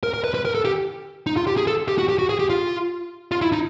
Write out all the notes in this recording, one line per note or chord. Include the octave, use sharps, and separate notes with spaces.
A#4
A#4
B4
B4
A#4
A4
G4
D#4
F4
G4
G#4
A4
G4
F#4
G4
F#4
G#4
G4
F4
F4
E4
D#4